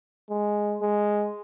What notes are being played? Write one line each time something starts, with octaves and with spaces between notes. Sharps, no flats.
G#3
G#3